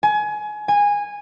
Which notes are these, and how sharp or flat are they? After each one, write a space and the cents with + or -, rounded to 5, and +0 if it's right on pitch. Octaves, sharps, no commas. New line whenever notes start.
G#5 +25
G#5 -15